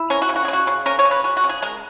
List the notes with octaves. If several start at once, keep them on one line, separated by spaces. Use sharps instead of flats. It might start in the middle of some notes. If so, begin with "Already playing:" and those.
Already playing: E4
C#4 A#4
F#4
C#3
F#4
G#4
C#3
F#4
C#3
C#4 A#4
C#5
C#3
B4
C#4 F#4
F#4
C#3
G#4
G#3 A#4